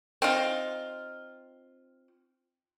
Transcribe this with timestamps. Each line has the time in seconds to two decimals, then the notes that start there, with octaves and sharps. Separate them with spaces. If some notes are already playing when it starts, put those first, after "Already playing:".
0.22 C4 D#4 F4